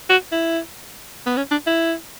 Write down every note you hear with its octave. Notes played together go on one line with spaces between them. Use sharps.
F#4
E4
B3
C#4
D4
E4